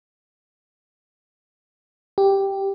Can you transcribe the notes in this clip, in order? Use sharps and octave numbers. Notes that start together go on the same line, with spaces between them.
G4